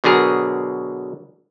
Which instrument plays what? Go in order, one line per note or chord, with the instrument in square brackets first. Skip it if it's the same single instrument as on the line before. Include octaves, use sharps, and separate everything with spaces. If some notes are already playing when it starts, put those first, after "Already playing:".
[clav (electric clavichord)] B2 D3 F#3 G#4 A#4